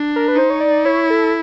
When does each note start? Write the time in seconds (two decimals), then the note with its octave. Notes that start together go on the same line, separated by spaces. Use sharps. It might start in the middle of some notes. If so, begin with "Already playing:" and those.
Already playing: D4
0.16 A#4
0.28 B4
0.36 D#4 C5
0.50 C#5
0.61 D5
0.85 E4 C#5
1.10 A4